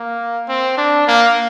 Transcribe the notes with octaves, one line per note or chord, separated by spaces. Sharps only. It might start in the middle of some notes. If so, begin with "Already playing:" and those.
Already playing: A#3
C4
D4
A#3